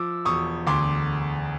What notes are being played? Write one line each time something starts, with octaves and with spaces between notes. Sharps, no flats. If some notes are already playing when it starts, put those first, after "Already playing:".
Already playing: F3 D6 E6
E1 C#6 D#6
D2 C6 D6